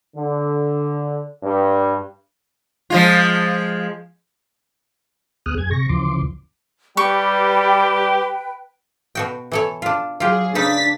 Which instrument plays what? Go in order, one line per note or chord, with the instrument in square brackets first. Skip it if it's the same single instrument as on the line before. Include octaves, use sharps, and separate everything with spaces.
[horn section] D3
G2
[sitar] F3 G#3 F4
[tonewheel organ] D2 B3 G#4 D#6 F6 F#6
F#2 G#4 G#6
C3 C#6 A#6
D2 C#3 E3 F3 C6 D6
[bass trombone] G3 [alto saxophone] G4 [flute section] B4 G5 [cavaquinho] C#6
[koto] B2 F#4 G5
E3 A4 C#5
D4 F4
[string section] F#3 G#4 [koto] F4 G4
[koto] C#3 D#4 B4 [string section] D4 A6 B6